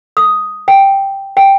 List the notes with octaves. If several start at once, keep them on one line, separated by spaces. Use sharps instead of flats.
D#6
G5
G5